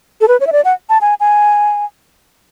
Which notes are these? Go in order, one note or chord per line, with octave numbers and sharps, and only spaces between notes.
A4
B4
C#5
E5
D5
F#5
A5
G#5
G#5